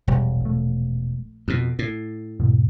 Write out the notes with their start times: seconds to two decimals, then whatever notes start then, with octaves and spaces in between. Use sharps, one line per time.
0.08 E1 A#1 G3
0.41 A#1 A3
1.48 F2 B2
1.79 A2
2.40 E2 G#2 B2